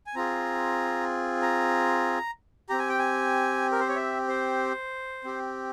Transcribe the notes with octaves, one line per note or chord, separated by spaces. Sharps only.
G#5
C4 F4 G#4 A#5
A#5
C4 G4 A#5
G#5
G5
G#5
A#4
C5
C#5
E5
C5
C4 G4